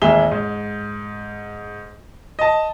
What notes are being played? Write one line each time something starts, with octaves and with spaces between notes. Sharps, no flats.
A1 D#2 G#3 G#4 E5 G7
G#2
D#5 A5